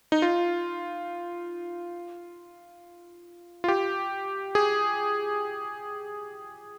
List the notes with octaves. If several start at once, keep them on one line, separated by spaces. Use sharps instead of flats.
D#4
F4
F4
G4
G#4